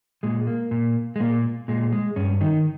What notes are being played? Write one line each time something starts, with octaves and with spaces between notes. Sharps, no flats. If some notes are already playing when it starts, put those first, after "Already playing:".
A#2 G#3
A#3
A#2
G#3
A#2 A#3
A#2 G#3
G#3
G2 C#4
D#3 D#4